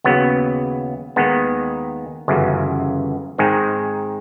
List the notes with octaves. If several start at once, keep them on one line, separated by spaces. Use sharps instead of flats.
D#2 C#3 F#3 B3
D#2 D#3 G#3 B3 D#4
G1 F#2 C#3 E3
G#2 D#3 G#3 C4 D#4